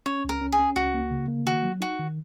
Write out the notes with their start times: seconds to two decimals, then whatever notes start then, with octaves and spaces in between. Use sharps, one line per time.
0.06 C#4 C#5
0.25 C#2 A#4
0.41 C#4
0.52 G#4
0.59 C#4
0.76 C#2 F#4
0.94 A#3
1.11 C#3
1.28 A#3
1.46 D#3 F#4
1.63 F#3
1.81 D#4 F#4
1.99 D#3